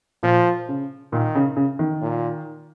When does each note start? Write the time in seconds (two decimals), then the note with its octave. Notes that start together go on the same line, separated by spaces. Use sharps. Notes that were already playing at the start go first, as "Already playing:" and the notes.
0.23 A#2 F3
0.69 C#3
1.13 A#2 D#3
1.35 C#3
1.57 C#3
1.79 D#3
2.02 A#2